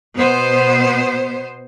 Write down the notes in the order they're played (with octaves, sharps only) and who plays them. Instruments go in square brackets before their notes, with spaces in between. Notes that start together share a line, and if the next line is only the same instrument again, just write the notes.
[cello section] B2 B3 C5